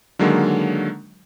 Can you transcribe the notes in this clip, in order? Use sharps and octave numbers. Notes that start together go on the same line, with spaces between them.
D3 D#3 F#3 G#3 A#3